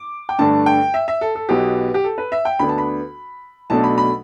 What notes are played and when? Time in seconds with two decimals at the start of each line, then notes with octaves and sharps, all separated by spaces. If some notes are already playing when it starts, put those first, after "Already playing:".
Already playing: D6
0.29 G5
0.39 G2 D3 A3 D4 A5
0.66 G5
0.94 E5
1.08 E5
1.21 A4
1.35 A4
1.49 B1 B2 B3 G4
1.94 G4
2.04 A4
2.18 B4
2.32 E5
2.45 G5
2.59 D2 D3 B3 D4 B5
2.69 A5
2.78 B5
3.70 B1 B2 A3 D4 A5
3.84 B5
3.98 B5